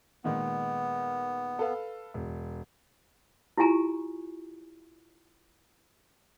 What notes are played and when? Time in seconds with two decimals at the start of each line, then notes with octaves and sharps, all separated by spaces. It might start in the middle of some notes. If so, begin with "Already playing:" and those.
0.24 A#2 D#3 G#3 B3
1.59 A4 B4 F5
2.14 E1
3.58 E4 F4 G4 G#5 A#5 C#6